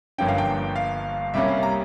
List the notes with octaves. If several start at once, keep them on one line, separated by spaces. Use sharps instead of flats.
G1 G2 F3 A#3 C#4 G5
F5
G5
F5
C2 C3 G3 A#3 C#4 E5
F5
A#5